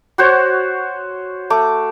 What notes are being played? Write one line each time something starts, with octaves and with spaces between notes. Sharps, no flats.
F#4 C5 C#5
A3 D6